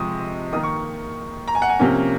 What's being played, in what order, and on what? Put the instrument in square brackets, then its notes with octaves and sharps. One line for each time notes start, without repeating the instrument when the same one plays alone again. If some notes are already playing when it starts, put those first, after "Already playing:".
Already playing: [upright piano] C3 F3 G#3 C#6 D#6
D#3 A#3 D#4 D#6
C#6
A#5
G#5
F#5
G#5
C3 F3 A#3 C#4